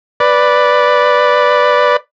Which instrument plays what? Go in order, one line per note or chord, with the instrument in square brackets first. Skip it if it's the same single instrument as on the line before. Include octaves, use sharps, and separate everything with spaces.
[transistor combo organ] B4 D5